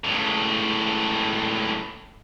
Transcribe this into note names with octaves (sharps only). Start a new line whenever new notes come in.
C#2 A2